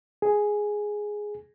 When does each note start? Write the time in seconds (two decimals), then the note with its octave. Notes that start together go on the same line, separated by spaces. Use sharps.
0.22 G#4